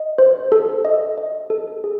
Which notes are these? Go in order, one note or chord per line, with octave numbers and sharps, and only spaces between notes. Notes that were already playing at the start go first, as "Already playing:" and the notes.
Already playing: D#5
C5
A4
D#5
D#5
A4
G#4